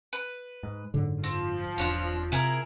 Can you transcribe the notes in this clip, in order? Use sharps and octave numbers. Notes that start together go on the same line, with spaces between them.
B4
G#2
F#1 G#2 D3
F3 C4
E1 C4 D4 C#5
C3 E4 G#4 A#4